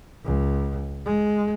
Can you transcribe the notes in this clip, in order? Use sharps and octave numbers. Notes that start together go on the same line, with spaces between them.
C#2
G#3